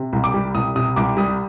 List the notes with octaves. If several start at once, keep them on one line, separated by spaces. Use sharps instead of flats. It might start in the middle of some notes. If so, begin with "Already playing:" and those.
Already playing: C3
C2
D6
G3
C2 D#6
C3 D#6
C2 D6
G3 D#6